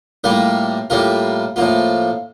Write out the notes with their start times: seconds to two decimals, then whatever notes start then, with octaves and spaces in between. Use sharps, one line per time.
0.24 A2 G3 A#3 F4 A#4
0.90 A2 G3 A#3 F4 A#4
1.56 A2 F3 A#3 F4